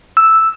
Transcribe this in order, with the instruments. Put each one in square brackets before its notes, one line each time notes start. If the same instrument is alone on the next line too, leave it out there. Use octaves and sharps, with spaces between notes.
[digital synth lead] E6